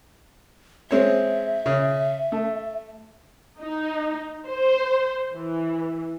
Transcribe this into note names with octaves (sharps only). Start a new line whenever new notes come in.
G#3 C4 C#5 E5
C#3
A3
D#4
C5
E3